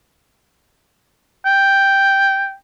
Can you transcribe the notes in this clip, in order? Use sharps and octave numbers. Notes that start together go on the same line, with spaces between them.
G5